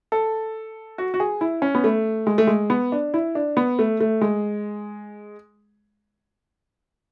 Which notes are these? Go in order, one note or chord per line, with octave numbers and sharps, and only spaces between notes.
A4
F#4
F#4
G#4
E4
C#4
B3
A3
G#3
A3
G#3
B3
D4
E4
D4
B3
A3
A3
G#3